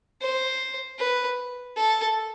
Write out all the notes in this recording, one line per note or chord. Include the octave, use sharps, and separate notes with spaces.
C5
B4
A4